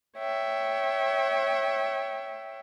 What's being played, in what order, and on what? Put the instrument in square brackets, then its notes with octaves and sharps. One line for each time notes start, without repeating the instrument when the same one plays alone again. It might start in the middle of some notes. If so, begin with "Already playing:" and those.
[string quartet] C#5 E5 G5